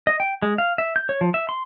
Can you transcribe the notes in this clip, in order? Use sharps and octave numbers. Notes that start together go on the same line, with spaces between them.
D#5
G5
G#3
F5
E5
G6
C#5
F3
E5
C6